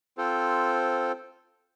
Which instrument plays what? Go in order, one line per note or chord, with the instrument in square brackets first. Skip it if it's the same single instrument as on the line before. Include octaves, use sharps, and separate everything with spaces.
[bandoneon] C4 F4 A4 C5